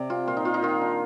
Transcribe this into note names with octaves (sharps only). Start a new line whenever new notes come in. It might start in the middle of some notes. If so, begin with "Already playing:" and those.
Already playing: C3 D5
C4 F4
A#2 F4
D#4
A#3 F4
D#4
D#3 F4
D4